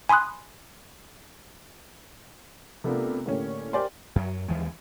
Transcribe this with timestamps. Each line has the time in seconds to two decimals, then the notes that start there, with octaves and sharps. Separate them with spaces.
0.09 G#5 B5 C6 D#6 F#6
2.84 C3 A3 B3 D4 F4 A#4
3.26 A2 D3 A#3 C#4 G4
3.73 G4 A#4 C5 D5 G#5 C6
4.16 F#2 F#3
4.48 D#2 E3 F3 G#3